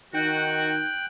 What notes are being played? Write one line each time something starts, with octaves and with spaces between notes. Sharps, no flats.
D#3 D#4 F#4 G5 F#6